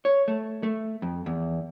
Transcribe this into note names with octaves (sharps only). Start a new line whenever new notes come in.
C#5
A3
A3
F2
E2